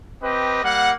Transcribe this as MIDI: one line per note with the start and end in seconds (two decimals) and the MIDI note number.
0.23 0.62 60
0.23 0.62 67
0.23 0.62 71
0.23 0.62 75
0.63 0.92 55
0.63 0.92 58
0.63 0.92 78